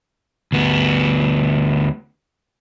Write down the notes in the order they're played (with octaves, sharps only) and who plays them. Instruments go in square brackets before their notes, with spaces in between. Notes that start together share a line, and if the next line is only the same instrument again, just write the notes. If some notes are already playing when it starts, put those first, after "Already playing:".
[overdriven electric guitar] D2 B3